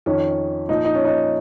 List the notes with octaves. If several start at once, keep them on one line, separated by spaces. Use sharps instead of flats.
F2 D#3 C#4
A#2 F3 D#4
D#4
C#4
D#4